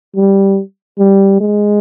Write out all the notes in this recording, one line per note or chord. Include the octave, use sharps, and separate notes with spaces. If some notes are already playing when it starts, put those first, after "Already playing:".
G3
G3
G#3